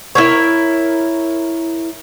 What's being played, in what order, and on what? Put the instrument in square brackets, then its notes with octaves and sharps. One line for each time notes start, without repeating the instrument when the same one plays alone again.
[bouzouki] E4 A#4 C#5